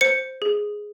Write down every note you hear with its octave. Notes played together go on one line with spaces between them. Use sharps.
C5 C#7
G#4